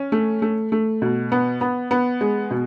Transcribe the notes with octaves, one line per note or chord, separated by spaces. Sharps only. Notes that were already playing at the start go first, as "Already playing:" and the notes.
Already playing: C#4
A3
A3
A3
B2
B3
B3
B3
G#3
B2